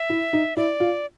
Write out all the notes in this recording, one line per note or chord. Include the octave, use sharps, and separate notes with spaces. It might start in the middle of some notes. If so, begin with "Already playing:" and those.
Already playing: E5
E4
D#4
E4 D5
F4